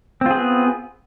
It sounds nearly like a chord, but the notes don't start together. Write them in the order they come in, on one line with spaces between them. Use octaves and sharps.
C4 F4 G#4 B3